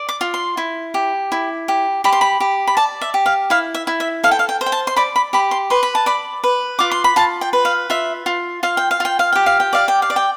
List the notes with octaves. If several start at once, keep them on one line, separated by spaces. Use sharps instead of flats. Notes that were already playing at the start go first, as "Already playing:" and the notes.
Already playing: D5
D6
F4
C6
E4
G4
E4
G4
G4 B5
C6
B5
G4
B5
D5 A5
E5
G4
F5
E4 F5
E5
E4
E5
A4 F5
G5
F5
G5
C5
G5
A5
C6
D5 B5
B5
G4 B5
C6
B4 C6
B5
A5
D5 B5
B4
F4 D6
C6
B5
F4 A5
G5
B4
F5
F4 E5
F4
F4 F5
G5
F5
F4 G5
F5
G4 G5
F5
G5
D5 F5
G5
F5
D5
G5